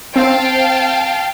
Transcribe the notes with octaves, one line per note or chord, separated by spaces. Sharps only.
C4 F5 G5 A5